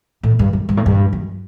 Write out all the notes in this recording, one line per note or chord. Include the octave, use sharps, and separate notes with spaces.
A2
G2
F#2
G2
A2
G2
F#2